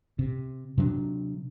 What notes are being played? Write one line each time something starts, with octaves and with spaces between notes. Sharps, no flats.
C3
C3 F#3 C#4 D4